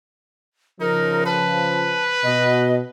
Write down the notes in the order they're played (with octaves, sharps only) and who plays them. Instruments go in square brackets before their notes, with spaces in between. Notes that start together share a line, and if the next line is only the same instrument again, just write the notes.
[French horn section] C#3 F3 [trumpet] D#4 [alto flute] A#4
[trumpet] B4 [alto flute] A5
[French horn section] B2 [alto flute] D#5